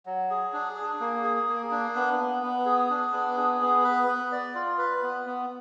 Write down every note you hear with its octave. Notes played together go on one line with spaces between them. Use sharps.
F#3
G#4
D4
G#4
A#3
G#4
A#3
D4
B3
B3
B3
G#4
D4
B3
G#4
B3
B4
B3
D5
F4
B4
B3
B3